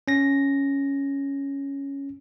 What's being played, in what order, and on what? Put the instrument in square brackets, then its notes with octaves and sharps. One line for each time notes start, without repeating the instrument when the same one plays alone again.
[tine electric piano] C#4 A#6